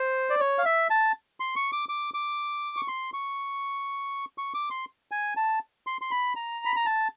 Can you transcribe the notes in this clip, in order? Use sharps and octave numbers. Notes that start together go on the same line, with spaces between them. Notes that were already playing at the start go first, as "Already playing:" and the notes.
Already playing: C5
D5
C#5
F5
E5
A5
C6
C#6
D6
D6
D6
C#6
C6
C#6
C#6
D6
C6
G#5
A5
C6
C6
B5
A#5
B5
A#5
A5